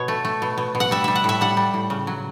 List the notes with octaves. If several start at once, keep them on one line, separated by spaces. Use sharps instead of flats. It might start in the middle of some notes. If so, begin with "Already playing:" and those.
Already playing: B2 C#5
A3
A3
B2
B2
B2
F#5
G3 E5
G3 E5
F#5
A2 E5
G3 F#5
G3
A2
C#3
F#3